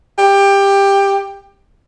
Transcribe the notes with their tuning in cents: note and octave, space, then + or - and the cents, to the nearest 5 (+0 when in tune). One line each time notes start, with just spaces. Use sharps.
G4 +15